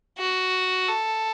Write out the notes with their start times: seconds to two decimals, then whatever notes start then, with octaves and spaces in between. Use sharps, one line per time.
0.18 F#4
0.88 A4